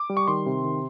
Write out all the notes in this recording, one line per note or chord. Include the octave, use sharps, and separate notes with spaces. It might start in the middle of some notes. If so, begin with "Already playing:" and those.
Already playing: D6
G3
C#6
D#3 C6
C3
D#3